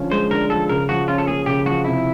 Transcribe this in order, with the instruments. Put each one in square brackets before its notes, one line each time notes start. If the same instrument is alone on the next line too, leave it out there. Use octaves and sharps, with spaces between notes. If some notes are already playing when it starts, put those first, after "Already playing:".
Already playing: [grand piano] D3 F3 C#4
[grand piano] G#3 [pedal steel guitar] C5
[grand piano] D3 [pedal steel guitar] A#4
[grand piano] F3 [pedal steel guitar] A4
[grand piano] C#3 [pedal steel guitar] A#4
[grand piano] F3 [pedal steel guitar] F#4
[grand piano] C#4 [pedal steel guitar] F4
[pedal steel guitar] A4
[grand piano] A#3 [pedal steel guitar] G#4
[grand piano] C#3 [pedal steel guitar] G4
[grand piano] F3 [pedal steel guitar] F#4
[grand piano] C3 [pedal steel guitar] E4